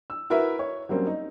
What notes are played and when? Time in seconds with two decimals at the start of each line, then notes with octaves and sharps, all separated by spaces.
0.10 E6
0.30 E4 F#4 A#4 B4 E5
0.59 C#5
0.89 F#3 G3 A#3 C4 C#4
1.07 D#4